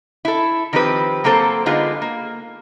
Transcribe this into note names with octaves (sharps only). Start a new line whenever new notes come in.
E4 A4
D#3 F3 C4 G4 B4
F#3 A#3 C4 A4 C5
D3 G#3 B3 D#4 F4 G#4
A#3